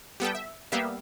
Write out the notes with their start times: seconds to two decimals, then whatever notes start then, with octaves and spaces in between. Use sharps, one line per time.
0.20 G3 B3 A4 G5
0.35 E5
0.72 G3 A#3 B3 G4 E5 F5